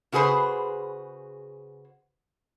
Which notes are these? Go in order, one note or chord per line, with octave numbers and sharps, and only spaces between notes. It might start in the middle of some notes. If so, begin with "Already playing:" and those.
C#3 F#4 G#4 B4 C5